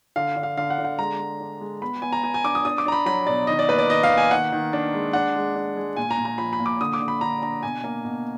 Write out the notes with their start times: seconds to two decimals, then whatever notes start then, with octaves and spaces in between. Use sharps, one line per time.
0.16 D3 F5
0.36 D3
0.43 F5
0.57 D3 F5
0.70 F#5
0.78 D3
0.84 F#5
0.99 G#3 A#5
1.19 G#3
1.40 D4
1.61 G#3
1.82 B3 B5
2.02 B3 G#5
2.13 A#5
2.23 B3 G#5
2.34 G#5
2.44 D4 D6
2.55 D#6
2.65 D4 D#6
2.78 D6
2.86 D4 A#5
2.92 B5
3.06 F#3 B5
3.27 B2 D5
3.47 D#3 D#5
3.59 D5
3.69 A#3 B4
3.79 D5
3.89 D#3 D#5
4.03 F5
4.10 A#3
4.17 G#5
4.31 D#3 F#5
4.52 D#3
4.73 D4
4.94 G#3
5.13 D4 F#5
5.35 G#3
5.55 D4
5.77 G#3
5.96 A#2 G#5
6.11 A#5
6.17 A#2
6.25 A#5
6.38 F3 B5
6.53 B5
6.59 A#2
6.66 D6
6.81 D3 D#6
6.93 D6
7.02 D3
7.08 B5
7.21 D3 A#5
7.42 D4 A#5
7.63 B2 G#5
7.84 A#3
8.05 B2